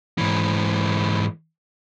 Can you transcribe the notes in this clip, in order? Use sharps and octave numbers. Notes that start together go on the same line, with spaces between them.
G#2 E3